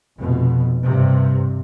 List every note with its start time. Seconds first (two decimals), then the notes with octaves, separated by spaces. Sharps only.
0.18 F1 B2
0.84 G2 C3